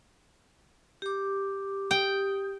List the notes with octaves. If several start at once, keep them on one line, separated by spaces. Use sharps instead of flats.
G4 D6
G4 G5 D#6